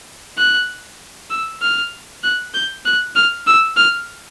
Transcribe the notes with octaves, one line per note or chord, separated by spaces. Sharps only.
F#6
E6
F6
F#6
G6
F#6
F6
E6
F6